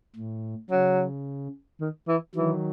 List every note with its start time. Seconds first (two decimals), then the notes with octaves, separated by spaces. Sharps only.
0.16 A2
0.71 C#3 F#3
1.81 D#3
2.08 E3
2.35 D#3 E3 F#3